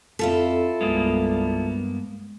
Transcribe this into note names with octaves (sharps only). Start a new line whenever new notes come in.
F2 E4 F4 A4
C2 G2 G#3 A#3 B3 G#4